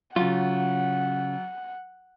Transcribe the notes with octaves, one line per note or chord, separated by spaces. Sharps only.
C#3 F#3 F4 F#5